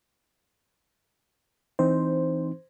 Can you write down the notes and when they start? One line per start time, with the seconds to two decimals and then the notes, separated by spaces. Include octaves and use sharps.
1.79 E3 C4 D#4 C5